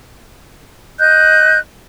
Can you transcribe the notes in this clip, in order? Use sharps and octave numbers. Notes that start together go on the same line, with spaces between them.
D#5 F#6 G6